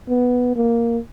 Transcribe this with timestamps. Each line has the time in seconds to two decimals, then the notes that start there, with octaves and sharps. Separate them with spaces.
0.09 B3
0.56 A#3